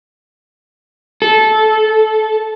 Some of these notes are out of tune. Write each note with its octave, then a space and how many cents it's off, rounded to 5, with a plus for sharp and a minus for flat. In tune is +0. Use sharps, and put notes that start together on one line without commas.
A4 -15